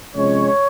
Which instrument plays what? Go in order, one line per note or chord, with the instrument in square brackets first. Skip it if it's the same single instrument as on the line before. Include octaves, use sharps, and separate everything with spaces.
[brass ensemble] C3 F3 G#3 C#4 C#5